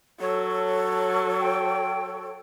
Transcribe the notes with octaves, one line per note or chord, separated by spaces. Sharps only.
F#3 A4 C#5
G5